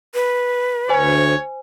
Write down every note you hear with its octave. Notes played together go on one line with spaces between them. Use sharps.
B4
D2 C5 C#5 G#5